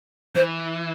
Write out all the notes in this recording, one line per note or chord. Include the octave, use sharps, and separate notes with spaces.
E3 C5